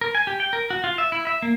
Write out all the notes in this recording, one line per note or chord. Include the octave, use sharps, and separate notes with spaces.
A#4
G#5
G4
G5
A#4
F#4
F4
E5
E4
E5
A#3